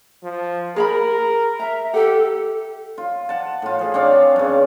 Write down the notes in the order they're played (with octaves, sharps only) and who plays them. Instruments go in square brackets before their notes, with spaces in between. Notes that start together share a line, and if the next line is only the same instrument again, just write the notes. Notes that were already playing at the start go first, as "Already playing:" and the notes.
[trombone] F3
[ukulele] G#4 A#5 B5 [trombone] A#4
[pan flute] E5 [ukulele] A#5
[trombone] G4 [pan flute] A4 [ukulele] F#5
[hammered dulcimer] F4
F#5 A5
A2 F4
F3 G#4
C4 D4 C#5 F5
G2 C#3